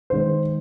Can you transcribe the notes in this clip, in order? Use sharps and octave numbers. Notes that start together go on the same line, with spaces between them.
D#3 G#3 C5